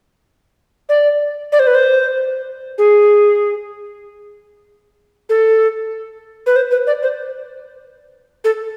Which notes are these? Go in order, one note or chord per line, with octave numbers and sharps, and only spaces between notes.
D5
D5
C5
B4
C5
G#4
A4
B4
C5
B4
D5
C5
A4